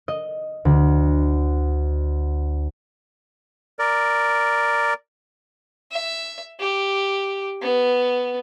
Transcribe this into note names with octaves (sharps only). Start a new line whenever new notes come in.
D#5
D2
A#4 D5
E5
G4
B3